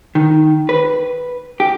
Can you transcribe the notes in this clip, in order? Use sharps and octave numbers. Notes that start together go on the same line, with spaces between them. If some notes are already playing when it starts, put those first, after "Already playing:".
D#3
B4
G4